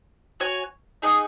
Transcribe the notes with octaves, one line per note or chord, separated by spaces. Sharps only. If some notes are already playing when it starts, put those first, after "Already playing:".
F#4 C#5 G#5
D#4 G#4 D#5 F#5